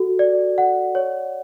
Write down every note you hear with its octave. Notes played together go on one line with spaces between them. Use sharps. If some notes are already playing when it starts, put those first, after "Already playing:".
Already playing: F#4 A4
D5
F#5
C#5